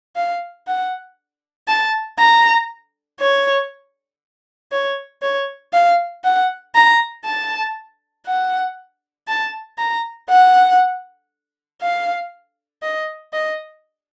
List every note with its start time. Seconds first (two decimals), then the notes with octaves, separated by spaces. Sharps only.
0.16 F5
0.67 F#5
1.68 A5
2.19 A#5
3.20 C#5
4.72 C#5
5.22 C#5
5.73 F5
6.24 F#5
6.75 A#5
7.25 A5
8.26 F#5
9.28 A5
9.78 A#5
10.29 F#5
11.81 F5
12.82 D#5
13.33 D#5